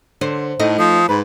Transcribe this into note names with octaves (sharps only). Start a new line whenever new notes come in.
D3 C5
A2 A3 D#4 D#5
F3 D#6
G#2 B4 B5